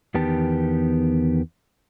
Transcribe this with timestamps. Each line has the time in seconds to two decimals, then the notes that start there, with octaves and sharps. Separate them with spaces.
0.14 E2 D#3 B3 G4 A5